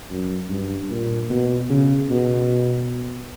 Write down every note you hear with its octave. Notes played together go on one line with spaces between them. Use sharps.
F#2
G2
A#2
B2
C#3
B2